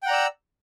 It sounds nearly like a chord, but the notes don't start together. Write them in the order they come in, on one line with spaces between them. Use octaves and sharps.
G5 F#5 A#5 D5 E6